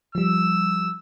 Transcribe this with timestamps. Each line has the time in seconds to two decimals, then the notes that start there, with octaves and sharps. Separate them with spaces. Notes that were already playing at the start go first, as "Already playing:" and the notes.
0.15 F3 G3 E6